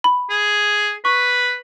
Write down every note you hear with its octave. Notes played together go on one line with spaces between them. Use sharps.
B5
G#4
B4 C#6